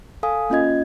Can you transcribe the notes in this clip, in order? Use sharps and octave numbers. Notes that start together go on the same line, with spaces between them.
A4 F5 G#5 D#6
A#3 C#4 F4 D#5 G#6